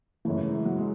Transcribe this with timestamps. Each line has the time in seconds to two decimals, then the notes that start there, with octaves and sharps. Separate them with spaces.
0.25 F#2 C#3 E3 A3
0.45 G#3
0.65 F#3
0.78 G#3